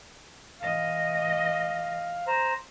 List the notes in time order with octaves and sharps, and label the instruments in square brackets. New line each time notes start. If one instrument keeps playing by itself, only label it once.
[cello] E3 D#5 [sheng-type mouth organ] F5
[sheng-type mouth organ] C5 A#5